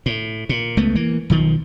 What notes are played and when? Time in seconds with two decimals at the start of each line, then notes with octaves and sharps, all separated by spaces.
0.06 A2
0.49 A#2
0.77 C#2 A3 B3
0.95 E3 A#3
1.30 B1 D#3 F3